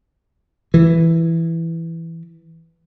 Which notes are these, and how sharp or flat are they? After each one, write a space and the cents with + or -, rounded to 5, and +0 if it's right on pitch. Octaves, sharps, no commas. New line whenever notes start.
E3 +5